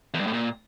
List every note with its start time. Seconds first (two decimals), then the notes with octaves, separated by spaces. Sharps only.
0.14 E2
0.20 G2
0.27 A2
0.33 A#2